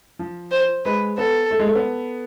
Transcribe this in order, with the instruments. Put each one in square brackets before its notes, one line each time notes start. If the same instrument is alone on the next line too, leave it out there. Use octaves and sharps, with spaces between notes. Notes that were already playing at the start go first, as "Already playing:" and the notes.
[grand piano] F3
[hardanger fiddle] C5
[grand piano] G#3 [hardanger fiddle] B4
[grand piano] B3 [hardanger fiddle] A4
[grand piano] A3
G#3
A3
B3